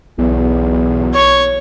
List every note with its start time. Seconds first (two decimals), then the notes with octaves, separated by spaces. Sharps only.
0.18 B1 E2
1.14 C#5 C#6